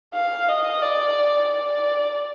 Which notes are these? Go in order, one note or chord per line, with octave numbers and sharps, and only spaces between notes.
F5
D#5
D5
D5